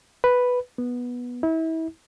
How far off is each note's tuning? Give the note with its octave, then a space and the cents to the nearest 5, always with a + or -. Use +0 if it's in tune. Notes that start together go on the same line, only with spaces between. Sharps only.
B4 +0
B3 -10
E4 -35